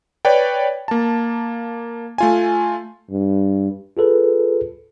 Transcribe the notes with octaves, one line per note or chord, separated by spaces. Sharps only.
B4 C#5 D5 G5
A#3 A5
A3 F4 G#5
G2
F4 G#4 A4 B4